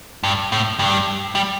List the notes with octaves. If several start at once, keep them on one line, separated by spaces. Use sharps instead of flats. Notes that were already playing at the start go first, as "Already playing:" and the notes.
G2
A2
G2
G3